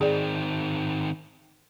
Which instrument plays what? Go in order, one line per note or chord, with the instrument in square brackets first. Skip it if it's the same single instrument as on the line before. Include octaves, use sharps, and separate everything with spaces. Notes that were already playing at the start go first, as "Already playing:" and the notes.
[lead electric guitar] D#3 C4 [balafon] G#4 D5